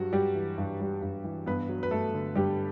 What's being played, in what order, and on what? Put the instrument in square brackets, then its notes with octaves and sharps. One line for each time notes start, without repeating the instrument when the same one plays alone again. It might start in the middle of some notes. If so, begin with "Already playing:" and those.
Already playing: [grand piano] G2 F#3 G3 F#4
G2 G3 G4
E3
G2
G3
G2
E3
G2 B3 B4
F#3
B4
G2 A3 A4
D3
G2 G3 G4